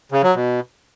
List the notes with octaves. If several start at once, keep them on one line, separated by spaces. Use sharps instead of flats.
C#3
F#3
B2